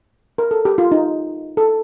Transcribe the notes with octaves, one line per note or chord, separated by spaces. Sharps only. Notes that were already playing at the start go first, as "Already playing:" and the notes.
A#4
A4
G4
F4
D#4
A4